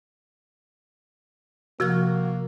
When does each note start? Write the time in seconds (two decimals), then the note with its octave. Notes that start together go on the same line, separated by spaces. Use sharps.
1.80 C3 F3 A#3 F#4 F6